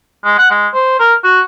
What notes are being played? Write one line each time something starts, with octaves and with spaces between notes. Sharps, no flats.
G#3
F#5
G#3
C5
A#4
F#4